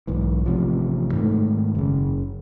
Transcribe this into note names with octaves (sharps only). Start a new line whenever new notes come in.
B1 G#2 E3
A1 C3 F3
G#2 D#3 A3
F#1 C#3